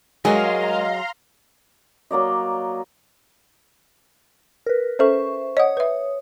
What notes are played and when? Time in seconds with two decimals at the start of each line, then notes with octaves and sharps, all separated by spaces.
0.25 F#3 G#3 G#4 A#4 D#5 F5 A#5 C6
2.11 F#3 A#3 D5 D#5
4.66 A#4 B4
4.99 C#4 A4 C5 E5 C#6
5.57 C#5 D#5 F#5 D#6
5.77 B4 E5